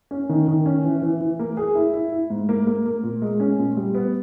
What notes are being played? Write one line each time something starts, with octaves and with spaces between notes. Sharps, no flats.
C#4
D#3
D#3
C#4
E3
E3
E3
A#3
G#4
E4
E4
E4
G#2
A#3
A#3
A#3
A#2
G#3
C#4
A#2
G3
B3